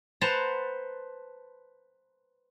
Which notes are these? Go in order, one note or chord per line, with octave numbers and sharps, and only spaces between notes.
B4 C5 F#5 A5 A#5